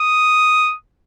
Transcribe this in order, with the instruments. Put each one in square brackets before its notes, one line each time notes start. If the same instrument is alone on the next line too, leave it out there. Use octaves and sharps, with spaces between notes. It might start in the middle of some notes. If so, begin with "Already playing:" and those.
Already playing: [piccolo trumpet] D#6